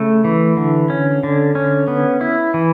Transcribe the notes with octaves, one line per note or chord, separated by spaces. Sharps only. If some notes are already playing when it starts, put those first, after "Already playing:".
Already playing: C#3 A3
E3
D3
C#4
D3
C#4
B3
E4
E3